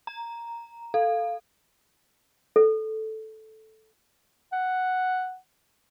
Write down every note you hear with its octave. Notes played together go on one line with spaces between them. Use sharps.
A#5
A4 F5
A4
F#5